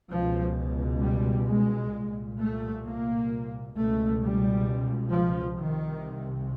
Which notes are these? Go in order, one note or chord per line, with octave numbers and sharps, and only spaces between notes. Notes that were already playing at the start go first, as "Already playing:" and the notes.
C#2 B2 F3
G3
G#3
C2 A#2
A3
A#3
C#2 B2 A3
G3
F3
C2 C3 D#3